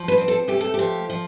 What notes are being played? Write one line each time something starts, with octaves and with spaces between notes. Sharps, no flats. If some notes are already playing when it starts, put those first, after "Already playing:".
Already playing: F3
B4
C4
A4
A3 G4
A4
F3 G4
F3